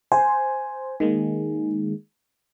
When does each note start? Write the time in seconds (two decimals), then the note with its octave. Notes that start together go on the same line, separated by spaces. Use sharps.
0.12 C5 G#5
1.00 D#3 G#3 A#3